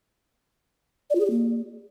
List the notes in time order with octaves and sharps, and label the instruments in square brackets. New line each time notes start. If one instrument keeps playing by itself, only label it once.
[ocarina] D5
F4
G#4
G4
A#3